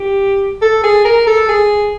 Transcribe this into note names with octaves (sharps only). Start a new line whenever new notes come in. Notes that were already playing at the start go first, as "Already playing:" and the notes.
Already playing: G4
A4
G#4
A#4
A4
G#4